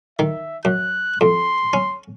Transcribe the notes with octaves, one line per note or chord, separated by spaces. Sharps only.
D#3 E5
F#2 F#6
F2 C6
C#4